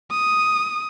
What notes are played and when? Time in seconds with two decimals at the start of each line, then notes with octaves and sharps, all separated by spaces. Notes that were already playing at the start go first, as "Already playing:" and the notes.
0.11 D#6